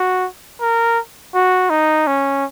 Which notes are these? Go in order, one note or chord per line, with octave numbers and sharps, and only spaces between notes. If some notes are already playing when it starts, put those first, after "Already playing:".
Already playing: F#4
A#4
F#4
D#4
C#4